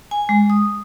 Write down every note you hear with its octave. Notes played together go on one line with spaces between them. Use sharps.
G#5
G#3
D#6